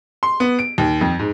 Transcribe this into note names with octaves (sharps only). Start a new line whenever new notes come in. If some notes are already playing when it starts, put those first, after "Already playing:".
C6
B3
D7
D#2
F2
G#2